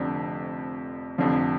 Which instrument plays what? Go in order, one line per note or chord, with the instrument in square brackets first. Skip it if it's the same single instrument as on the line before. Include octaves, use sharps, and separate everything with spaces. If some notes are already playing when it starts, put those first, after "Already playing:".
Already playing: [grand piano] F1 F2 D3
F1 F2 D3 F3